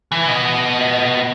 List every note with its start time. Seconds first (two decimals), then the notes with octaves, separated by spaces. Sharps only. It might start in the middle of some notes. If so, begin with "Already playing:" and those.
0.12 E3
0.28 B3 D#5